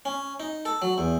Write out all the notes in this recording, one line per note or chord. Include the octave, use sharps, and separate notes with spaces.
C#4
D#4
A4
F#3
E2